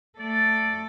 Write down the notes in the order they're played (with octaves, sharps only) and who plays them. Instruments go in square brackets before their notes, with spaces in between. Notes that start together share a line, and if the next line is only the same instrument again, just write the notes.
[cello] A3 A4 [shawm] D5